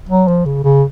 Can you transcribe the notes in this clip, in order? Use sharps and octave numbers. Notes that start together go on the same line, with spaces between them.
F#3
F3
C#3
C#3